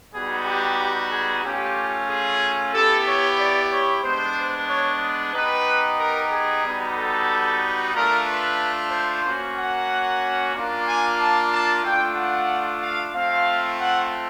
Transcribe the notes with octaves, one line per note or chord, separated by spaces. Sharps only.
G3 B3 D#4 F#4 G#4
G4
G#4
A3 C#4 F4 G4
G#4
B3 E4 G4 A4
C#5
D5
C#5
G#3 B3 D4 C5
C#5
B3 D#4 G4 B4
A#4
G#4
G3 B3 D#4 F#4
A4
A3 D4 F4 A#4
B4
C5
A#3 C#4 F#4
F#5
A#3 D4 F4
G#5
A5
A5
A3 D4 F4 G5
F#5
F5
A3 C4 F4 F5
F#5